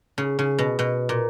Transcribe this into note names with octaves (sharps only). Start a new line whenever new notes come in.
C#3
C#3
B2
B2
A#2